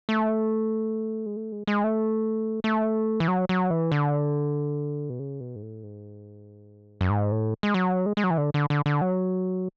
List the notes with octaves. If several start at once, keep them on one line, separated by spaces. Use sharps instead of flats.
A3
G#3
A3
G#3
G#3
A3
A3
E3
F#3
F#3
E3
D3
B2
C#3
B2
G#2
A2
G#2
F#2
G#2
A2
G#3
F#3
G#3
G#3
F#3
E3
D3
D3
D3
D3
F#3